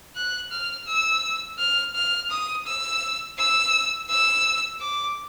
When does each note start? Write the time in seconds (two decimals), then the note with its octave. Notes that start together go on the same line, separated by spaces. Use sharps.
0.16 F#6
0.51 F6
0.87 E6
1.59 F6
1.95 F6
2.30 D#6
2.66 E6
3.38 E6
4.09 E6
4.80 D6